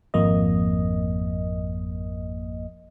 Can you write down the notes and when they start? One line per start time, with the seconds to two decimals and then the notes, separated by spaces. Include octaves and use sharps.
0.14 G#1 F2 A#3 D#5